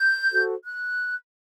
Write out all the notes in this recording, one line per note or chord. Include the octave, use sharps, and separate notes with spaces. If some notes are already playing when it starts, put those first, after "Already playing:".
Already playing: G6
F#4 A4 C5
F#6